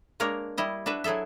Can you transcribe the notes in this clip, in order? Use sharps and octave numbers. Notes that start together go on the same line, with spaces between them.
G#3 A#3 D4 A#4 C#5
G3 E4 D#5
D4 F#4 B4 E5
F#3 E4 G#4 A4 E5